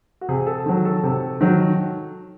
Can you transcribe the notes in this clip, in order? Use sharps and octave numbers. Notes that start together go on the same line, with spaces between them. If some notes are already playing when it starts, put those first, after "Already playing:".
F#4
C3 G#4
A4
D#3 F#3
A4
C3
D#3 F#3